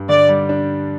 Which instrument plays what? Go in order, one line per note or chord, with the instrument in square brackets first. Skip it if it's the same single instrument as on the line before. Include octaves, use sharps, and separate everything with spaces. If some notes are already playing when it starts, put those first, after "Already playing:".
Already playing: [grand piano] G2
[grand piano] D3 [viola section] D5
[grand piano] G3
D4